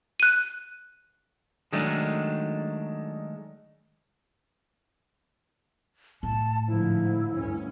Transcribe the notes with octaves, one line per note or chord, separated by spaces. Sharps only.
F#6 D#7
D#3 F#3 G#3 A3 D4
A2 A5
G#2 D3 F3 E4
D2 G2 C#4